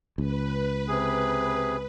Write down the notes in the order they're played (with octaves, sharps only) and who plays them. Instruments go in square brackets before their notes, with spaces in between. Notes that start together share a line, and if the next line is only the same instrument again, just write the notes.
[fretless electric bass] C#2 [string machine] B4
[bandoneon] C3 G#4